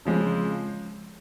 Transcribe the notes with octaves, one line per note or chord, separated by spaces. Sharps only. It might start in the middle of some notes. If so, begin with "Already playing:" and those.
C#3 F3 G#3 C4